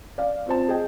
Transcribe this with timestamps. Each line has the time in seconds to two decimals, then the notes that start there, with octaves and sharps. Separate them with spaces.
0.18 D5 F5
0.46 C4 F4 C5 A5
0.68 G#4 D#5 G5